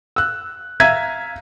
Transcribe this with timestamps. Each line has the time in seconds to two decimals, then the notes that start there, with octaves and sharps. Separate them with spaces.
0.16 E6 F#6
0.80 E5 F5 A#5 G#6 B6 D#7